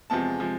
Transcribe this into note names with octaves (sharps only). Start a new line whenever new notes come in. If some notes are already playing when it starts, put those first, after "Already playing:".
E2 C3 F3 G#3 A5
C3 F3 G#3